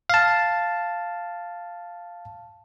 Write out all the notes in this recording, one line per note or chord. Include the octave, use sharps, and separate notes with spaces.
F5 A5